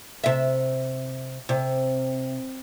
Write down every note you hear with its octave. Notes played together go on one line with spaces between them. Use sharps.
C3 E5
C3